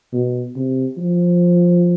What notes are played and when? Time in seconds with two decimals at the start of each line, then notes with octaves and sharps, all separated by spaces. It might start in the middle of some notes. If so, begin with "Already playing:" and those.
0.13 B2
0.56 C3
0.98 F3